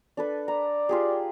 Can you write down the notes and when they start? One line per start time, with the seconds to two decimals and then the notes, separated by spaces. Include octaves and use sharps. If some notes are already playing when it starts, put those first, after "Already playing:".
0.17 D4 A4 B4
0.48 D5 A#5
0.89 F4 G4 G#4